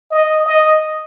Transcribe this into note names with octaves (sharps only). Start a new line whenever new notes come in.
D#5
D#5